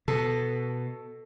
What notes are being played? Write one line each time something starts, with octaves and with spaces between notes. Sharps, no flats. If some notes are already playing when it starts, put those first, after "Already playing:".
B2 A4